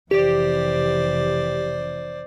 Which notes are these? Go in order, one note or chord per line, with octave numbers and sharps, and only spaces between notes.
F1 E3 G4 C5 D5